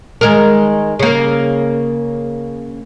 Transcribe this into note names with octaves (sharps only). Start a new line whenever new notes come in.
D#3 G#3 A#4
C#3 A#3